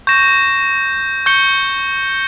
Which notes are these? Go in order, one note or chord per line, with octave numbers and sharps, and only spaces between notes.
C#6 G6 A#6 E7
C#6 G6 C#7 G7